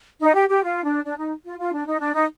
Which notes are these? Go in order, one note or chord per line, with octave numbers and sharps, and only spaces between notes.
D#4
G4
G4
F4
D4
D4
D#4
F4
F4
D4
D#4
D4
D#4